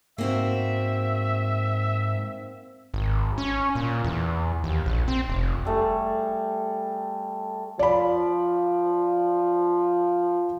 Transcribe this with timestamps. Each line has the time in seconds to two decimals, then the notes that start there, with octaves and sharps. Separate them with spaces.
0.18 G#2 A#3 C4 F#4 E5
2.94 G#1
3.38 C#4
3.75 A#2
4.05 E2
4.64 D#2
4.86 A#1
5.08 C4
5.29 F1
5.65 G3 A3 G#4
7.79 F3 D5 B5